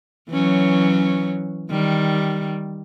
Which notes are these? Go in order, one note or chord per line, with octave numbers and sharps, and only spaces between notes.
E3 F#3 C#4
D#3 G3